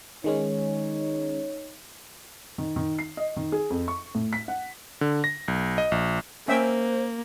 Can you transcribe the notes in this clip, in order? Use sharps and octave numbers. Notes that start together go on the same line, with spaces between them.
D#3 G#3 C#4 D#4 C#5
D#3
D#3
C7
D#5
D#3
G#4
F2
C#6
A2
B6
F#5
D3
A#6
B1
D#5
A#1
A#3 C#4 C5 E5 G5